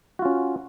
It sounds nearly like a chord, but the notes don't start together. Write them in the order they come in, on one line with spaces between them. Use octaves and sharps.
F#4 F4 C#4